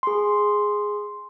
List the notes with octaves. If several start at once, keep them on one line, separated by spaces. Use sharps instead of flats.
G#4 C6